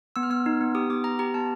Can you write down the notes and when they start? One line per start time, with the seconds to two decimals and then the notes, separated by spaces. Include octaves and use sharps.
0.16 B3 E6
0.23 F6
0.30 B3 E6
0.46 D#4
0.61 B3
0.75 G4 D#6
0.90 B3 D6
1.04 B3 A#5
1.19 G4 A#5
1.34 B3 A5